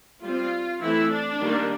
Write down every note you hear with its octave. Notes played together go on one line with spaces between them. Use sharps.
G3 F4
C4
E3 A3 C4 E4
D4
D#3 G3 A#3